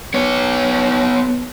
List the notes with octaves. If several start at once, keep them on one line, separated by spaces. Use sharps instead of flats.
B3 C#5